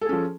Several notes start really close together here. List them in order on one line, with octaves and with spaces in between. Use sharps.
A4 G#4 C#4 F3